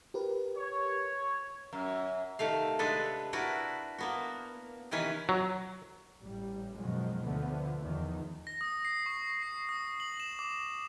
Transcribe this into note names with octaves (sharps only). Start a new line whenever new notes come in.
G4 A#4 B4
C#5
F#2
C3 D#3 A3 F5
C3 G#3 D4 G#4 A4 B4
D4 E4 F#4 A#4 B4
A#3 B3 F#4
C3 D#3 E3 C#4 B4 G#5
F#3
A1 G3
F#2 B2 D#3 F3 F#3 G#3
D2 D3 F3 A3 B3
E2 D#3 F3
A#6
D#6
C7
C#6
C7
D#6
F#7
E7
D6